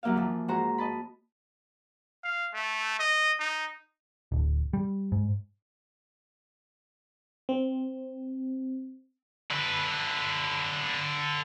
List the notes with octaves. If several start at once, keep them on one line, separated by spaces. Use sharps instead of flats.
F#2 F#3 A#3 E5 F5
E3 F3
G#2 F#4 C5 A#5
D#5 A5 B5
F5
A3
D#5
D#4
D1
G3
G#2
C4
D3 B4